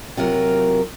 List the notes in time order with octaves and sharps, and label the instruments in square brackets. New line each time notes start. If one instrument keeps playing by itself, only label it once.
[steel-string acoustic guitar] C3 F#3 F4 A#4